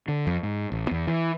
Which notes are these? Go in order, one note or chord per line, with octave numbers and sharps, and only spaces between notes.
D3
F2
G#2
A1
E2
E3